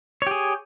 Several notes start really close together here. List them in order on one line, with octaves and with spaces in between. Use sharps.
C#5 G4 G#4